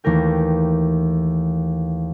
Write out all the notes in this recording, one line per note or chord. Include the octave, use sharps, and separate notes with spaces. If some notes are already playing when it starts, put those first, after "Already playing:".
D#2 E3 A3 A#4 G5